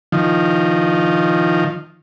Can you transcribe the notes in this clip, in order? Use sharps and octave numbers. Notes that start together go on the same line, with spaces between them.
D#3 F3